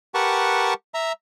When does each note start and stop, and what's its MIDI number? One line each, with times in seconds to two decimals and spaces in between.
0.14 0.74 67
0.14 0.74 70
0.14 0.74 71
0.14 0.74 78
0.14 0.74 81
0.14 0.74 85
0.94 1.12 76
0.94 1.12 82